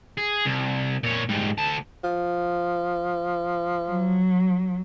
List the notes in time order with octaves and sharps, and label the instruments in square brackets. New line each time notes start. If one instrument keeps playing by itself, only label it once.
[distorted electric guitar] G#4
C2
A#2 C#5
G#2 G3
D2 A5
[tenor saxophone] F3
[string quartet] F#3